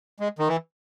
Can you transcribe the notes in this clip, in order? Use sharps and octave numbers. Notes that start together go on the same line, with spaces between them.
G#3
D#3
E3